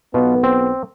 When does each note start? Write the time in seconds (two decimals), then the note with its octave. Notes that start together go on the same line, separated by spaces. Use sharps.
0.14 B1 B2 B3 F4
0.43 C4